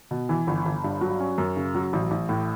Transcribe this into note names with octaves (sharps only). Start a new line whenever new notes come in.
B2
E3
G1
G1
G2
F#3
C#4
F#2
C#3
F#3
A1
A1
A2